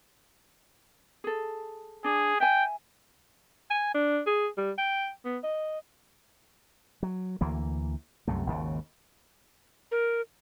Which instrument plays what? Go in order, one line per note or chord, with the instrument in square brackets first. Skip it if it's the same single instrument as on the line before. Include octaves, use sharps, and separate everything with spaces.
[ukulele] G#4 A4
[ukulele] D4 [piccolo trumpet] G#4
[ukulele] E5 G#5 [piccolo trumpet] G5
[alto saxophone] G#5
D4
G#4
G3
G5
B3
D#5
[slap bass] F#3
D2 E3 A#3
C2 F#2 C3 A3
G#1 D#2 C#3
[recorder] A#4